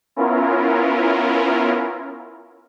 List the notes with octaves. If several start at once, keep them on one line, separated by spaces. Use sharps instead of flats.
B3 C#4 E4 F4 A#4